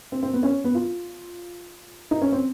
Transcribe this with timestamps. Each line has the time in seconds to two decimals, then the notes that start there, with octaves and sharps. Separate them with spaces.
0.12 C4
0.23 C4
0.34 B3
0.43 C#4
0.64 B3
0.75 F4
2.11 D#4
2.22 C#4
2.32 C4